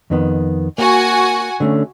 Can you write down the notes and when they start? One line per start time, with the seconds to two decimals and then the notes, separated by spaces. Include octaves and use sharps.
0.10 F2 D#3 B3
0.78 A#3 F#4 G#5
1.60 D3 A3 C#4